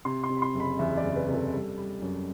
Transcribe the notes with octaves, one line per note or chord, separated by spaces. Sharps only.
C3 C6
C6
C3
B5
C6
F#1
B5
E2 E5
D5
F#1
B4
C3
A4
G3
G3
F#2